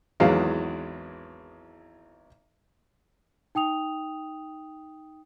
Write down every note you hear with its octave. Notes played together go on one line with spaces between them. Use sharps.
G#1 E2 E3 F#3 G#3 F5
D#4 G5 D#6 F7